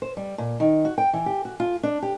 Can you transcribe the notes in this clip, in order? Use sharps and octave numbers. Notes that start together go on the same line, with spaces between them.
C5
G3
A#2
D#3
F#4
G5
E3
G4
F#4
F4
D4
G4